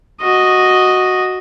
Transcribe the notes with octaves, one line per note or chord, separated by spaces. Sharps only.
F#4 D#5